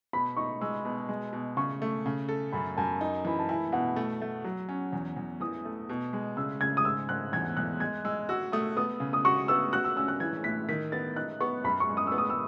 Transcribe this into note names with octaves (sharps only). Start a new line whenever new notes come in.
B2 B5
D#4 C#6
G#3 E6
B2
G#3
B2
C#3 C#6
A3
C#3
A4
F#2 B5
F#2 A5
D#4
E3 B5
A5
E4 G#5
B2 F#5
A3
A3
F#3
C#4
E2
E2
E3 D#6
A3
B2
G#3
C#3 E6
C#3 G#6
D#6
G#2 E6
G#2 F#6
E2 G#6
E2 F#6
G#3 G#6
G#3 E6
F#4 E6
A3 D#6
B3 D#6
C#3
D#6
F#4 C#6
B3 E6
F#4 F#6
E6
C#4 E6
F#6
E3 G#6
A2 B6
D#3 B6
B3 A6
D#4 F#6
B3 C#6
F#2 B5
C#6
G#3
D#6
B3 E6
D#6
E6